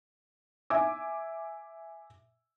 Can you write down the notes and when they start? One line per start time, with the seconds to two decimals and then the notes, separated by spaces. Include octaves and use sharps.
0.70 E5 G#5 D6